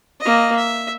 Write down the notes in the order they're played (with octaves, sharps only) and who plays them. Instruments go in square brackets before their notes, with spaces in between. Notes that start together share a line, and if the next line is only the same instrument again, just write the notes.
[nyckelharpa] A#3 D#5
E5